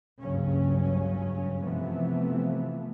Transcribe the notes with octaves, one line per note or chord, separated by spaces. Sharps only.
F#1 C#2 G2 C#3 F#3 C#4
C3 E3 F3 A3 B3